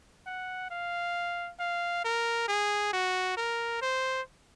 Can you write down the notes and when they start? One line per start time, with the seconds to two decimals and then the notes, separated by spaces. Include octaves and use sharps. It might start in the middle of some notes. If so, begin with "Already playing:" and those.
0.26 F#5
0.71 F5
1.59 F5
2.04 A#4
2.48 G#4
2.93 F#4
3.37 A#4
3.81 C5